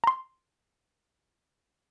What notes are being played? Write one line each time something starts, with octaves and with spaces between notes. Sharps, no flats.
A#5 C6